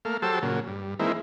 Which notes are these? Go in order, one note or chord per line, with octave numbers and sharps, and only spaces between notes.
A3 A#3 F5
F#3 G4 A4 C5 A5 E6
A#2 C#3 F#3
G2
E3 G#3 A#3 C4 D#4 E4